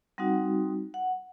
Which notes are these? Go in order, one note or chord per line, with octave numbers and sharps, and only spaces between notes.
G3 C4 D#4 F#4 F#5
F#5